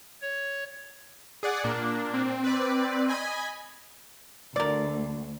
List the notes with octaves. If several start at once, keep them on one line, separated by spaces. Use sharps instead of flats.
C#5
G#4 D5 F#5
A#2 A#3 D4
C4
B4 D5
D#5 G#5 B5
D2 A#4 D5